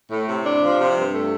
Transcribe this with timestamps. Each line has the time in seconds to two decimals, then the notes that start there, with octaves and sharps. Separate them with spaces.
0.11 A2
0.28 C3
0.45 D4
0.62 F3
0.79 C3
0.96 G2
1.13 A3